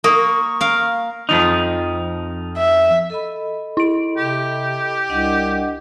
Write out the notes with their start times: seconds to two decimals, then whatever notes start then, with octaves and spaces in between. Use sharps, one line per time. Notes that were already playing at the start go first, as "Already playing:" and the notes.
0.04 A#3 C#6 D#6
0.61 A#4 F5
1.29 F2 F3 D#4
2.57 E5
3.10 A4 D#5 B5
3.77 E4 D7
4.17 C3 G4
5.10 C2 D4 D#5 F#5